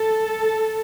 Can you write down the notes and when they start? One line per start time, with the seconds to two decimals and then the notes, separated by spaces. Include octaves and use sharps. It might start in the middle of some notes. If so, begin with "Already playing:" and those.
Already playing: A4